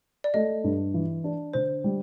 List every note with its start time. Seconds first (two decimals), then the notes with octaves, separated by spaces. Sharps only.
0.24 D5
0.34 A3 D#5
0.64 G2
0.94 E3
1.24 D4
1.53 D3 C5
1.84 G3